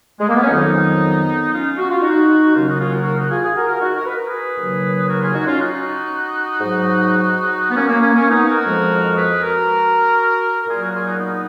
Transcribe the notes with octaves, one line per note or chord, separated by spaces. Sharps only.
G#3
A#3
B3
C#4
F2 D#3 F#3 B3 D#4
C#4 F4
F#4
F4
D#4 F#4
D#2 C#3 F#3 C#4 F4
D#4 F#4
C#4 F4
F#4 A#4
F#4 A#4
D#4 F#4
F4 G#4
F4 G#4
F#4 A#4
F#4 A#4
D#4 F#4
F#4 A#4
B4
A#4
G#4 B4
D#2 C#3 F#3
F#4 A#4
F4 G#4
D#4 F#4
C#4 F4
D#4 F#4
G#2 F#3
B3
A#3 C#4
A#3
A#3 C#4
A#3 C#4
B3 D#4
F#4 A#4
F2 F3 G#3
G#4 B4
F#4 A#4
A#4
A#2 F#3 F4 G#4
F#4 A#4
F4 G#4
D#4 F#4
B3 D#4